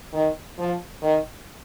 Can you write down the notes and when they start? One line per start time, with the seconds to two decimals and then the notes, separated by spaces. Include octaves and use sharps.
0.13 D#3
0.58 F3
1.02 D#3